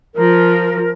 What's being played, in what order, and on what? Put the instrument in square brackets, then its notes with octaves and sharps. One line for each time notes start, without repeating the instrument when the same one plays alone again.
[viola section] F3 [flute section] A#4